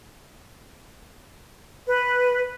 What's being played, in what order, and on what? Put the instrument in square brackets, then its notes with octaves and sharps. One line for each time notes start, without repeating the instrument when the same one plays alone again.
[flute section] B4